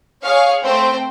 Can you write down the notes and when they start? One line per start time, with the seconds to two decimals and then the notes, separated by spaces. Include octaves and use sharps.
0.23 G#4 C#5 F5
0.64 A3 C4 C5 G5